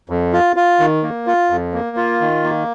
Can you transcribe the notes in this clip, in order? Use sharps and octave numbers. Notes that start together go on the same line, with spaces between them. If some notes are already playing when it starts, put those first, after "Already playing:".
F2
F4
F4
D#3
A#3
F4
F2
A#3
F4
D#3
A#3